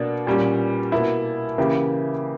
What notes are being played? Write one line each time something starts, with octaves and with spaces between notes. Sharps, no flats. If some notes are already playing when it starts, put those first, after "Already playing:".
Already playing: B2 A#3 D4
A#2 G3 C#4
B2 A#3 E4
C#3 E3 A#3 E4 G4